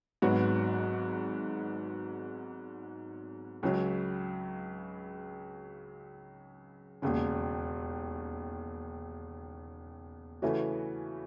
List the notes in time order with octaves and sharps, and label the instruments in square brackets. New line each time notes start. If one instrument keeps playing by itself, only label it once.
[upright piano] G#1 G#2 F#3 B3 F#4
C#2 C#3 F#3
E1 D#2 C#3
C#3 E3 A3 C#4 F#4